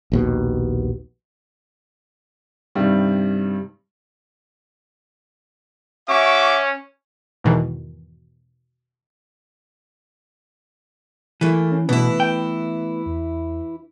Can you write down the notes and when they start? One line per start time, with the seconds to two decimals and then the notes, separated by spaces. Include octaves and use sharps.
0.12 A#1 D#2 B2
2.75 G2 C3 D#3 G3
6.09 C#4 F#4 E5 C#6 D6
7.44 E2 G#2 B2 D#3 E3
11.41 E3 A3 A#3
11.72 C#4
11.89 B2 E3 A3 B3 E4 B4
12.20 G5
13.06 E2